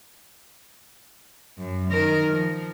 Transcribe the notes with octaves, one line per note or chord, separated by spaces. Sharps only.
F#2
D#3 A#4
F3